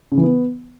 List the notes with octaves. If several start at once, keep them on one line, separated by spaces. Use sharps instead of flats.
C#3
E3
B3